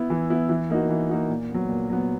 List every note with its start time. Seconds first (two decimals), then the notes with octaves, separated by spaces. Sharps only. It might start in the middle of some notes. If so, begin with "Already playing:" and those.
Already playing: B3 E4
0.10 E3
0.30 B3 E4
0.49 E3
0.70 A#3 D#4 F#4
0.89 E3
1.09 A#3 D#4 F#4
1.29 A#2
1.50 F#3 B3
1.69 A#2
1.90 F#3 B3